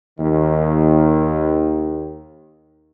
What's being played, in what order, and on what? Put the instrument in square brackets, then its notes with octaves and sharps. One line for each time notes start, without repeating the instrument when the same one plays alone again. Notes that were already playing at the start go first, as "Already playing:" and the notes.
[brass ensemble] D#2 D#3